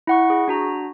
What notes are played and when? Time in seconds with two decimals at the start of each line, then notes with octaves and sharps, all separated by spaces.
0.07 E4 F#5 C#6
0.30 G#4
0.48 D4 F#4 A#5